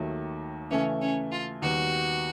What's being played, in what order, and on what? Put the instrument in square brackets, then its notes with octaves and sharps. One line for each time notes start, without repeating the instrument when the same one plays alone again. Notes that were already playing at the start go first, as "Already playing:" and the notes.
Already playing: [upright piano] D#2 D#3 F#3 A3
[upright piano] C#3 E3 A3 [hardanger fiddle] C#4
[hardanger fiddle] C#4
F4
[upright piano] D#2 D#3 G3 B3 [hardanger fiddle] F#4